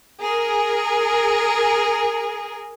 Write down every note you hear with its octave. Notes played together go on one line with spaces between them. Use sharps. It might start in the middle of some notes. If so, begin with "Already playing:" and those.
G#4 A#4